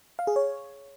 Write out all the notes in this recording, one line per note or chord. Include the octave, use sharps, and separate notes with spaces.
F5
G#4
C#5